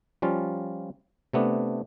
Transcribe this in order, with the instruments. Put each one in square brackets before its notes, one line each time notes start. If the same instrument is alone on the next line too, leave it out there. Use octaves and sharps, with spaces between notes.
[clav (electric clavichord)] F3 G3 C#4 F4
C3 A3 B3 D4